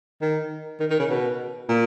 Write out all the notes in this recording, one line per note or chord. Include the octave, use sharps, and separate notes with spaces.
D#3
D#3
D#3
C#3
B2
A#2